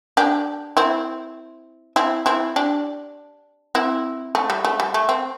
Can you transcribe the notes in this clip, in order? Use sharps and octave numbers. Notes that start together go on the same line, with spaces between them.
D4 G4
C4 E4
C4 E4
C4 E4
D4 G4
C4 E4
A3
G3
A3
G3
A3
C4